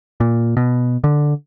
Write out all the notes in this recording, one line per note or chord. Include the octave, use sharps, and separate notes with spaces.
A#2
B2
D3